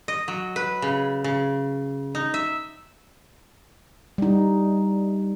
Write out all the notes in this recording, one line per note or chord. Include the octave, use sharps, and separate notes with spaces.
D#5
F#3
B4
C#3
C#3
D#4
E5
G3 D#4